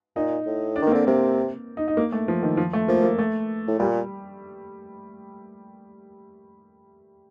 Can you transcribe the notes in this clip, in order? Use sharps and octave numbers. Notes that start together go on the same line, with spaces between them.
A#2 D#4
A2
D4
D#3 A#3
C4
D3
C3 A#3
D#4
D#4
A#3
A3
F3
D#3
F3
A3
F3 A#3
A#3
A3
A2
A#2 G3